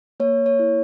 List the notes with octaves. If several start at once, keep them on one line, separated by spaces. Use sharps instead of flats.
A#3 C#5
C#5
E4